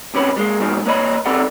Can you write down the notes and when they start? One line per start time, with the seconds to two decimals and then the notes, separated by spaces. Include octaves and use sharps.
0.15 C3 C#4 B4
0.36 G3 G#3 A#3
0.60 G#2 B2 D#3 F3
0.86 A#3 B4 C#5 D#5 B5
1.26 C4 G4 A4 B4 D5 F#5